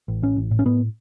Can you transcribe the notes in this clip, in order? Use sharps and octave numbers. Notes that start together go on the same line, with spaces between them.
A1
A2 C#4
A1
A2
C#4
A2 B3